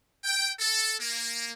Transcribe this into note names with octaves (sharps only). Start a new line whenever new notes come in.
G5
A4
A#3